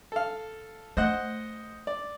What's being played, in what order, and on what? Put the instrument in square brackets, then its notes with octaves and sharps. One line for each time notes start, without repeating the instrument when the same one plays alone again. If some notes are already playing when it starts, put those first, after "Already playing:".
[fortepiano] A4 F5
[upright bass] A3 [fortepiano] C5 D#5 F#5
[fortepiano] D5